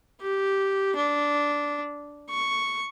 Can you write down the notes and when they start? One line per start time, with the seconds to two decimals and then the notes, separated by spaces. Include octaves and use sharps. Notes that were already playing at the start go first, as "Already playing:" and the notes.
0.22 G4
0.96 D4
2.30 C#6